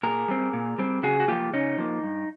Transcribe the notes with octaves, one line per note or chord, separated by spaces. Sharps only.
A#2 G#4 A#4
G3 C4
A#2
G3 C4
C#3 F#4 G#4
F#4
F3 A#3 F4 G4
C#3 C#4 D#4
F3 A#3
G2